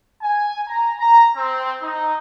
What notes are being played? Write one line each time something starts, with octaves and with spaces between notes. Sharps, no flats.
G#5
A#5
A#5
C4
D#4